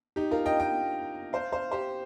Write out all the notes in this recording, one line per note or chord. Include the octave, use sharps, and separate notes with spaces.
D#4 G4
F4 A#4
D#5 G5
D#5 G5
C5 F5
C5 F5
G4 C5